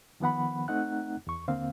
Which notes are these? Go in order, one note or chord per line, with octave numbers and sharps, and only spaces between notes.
D#3 F3 B3 F#5 B5
A3 C4 D#4 F#5 F#6
E2 C#6
D#2 D3 A#3 C4 F5